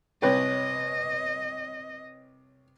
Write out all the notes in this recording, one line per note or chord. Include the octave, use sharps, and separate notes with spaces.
C2 B4 C#5 D#5 G5